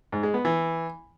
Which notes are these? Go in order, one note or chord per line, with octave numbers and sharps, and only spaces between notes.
G#2
G#3
B3
E3